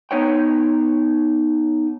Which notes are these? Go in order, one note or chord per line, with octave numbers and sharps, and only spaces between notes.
B3 D#4 C#5 G5